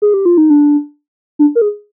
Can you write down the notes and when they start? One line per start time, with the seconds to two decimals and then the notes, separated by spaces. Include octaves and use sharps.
0.02 G#4
0.14 G4
0.25 F4
0.38 D#4
0.50 D4
1.39 D4
1.55 A#4
1.62 G#4